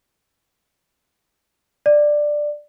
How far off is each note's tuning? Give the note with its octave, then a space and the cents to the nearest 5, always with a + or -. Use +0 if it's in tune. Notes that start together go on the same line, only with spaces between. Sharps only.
D5 +10